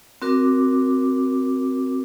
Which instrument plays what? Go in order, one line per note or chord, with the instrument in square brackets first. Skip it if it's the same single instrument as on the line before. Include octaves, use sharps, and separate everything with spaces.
[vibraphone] C4 F#4 A#4 D6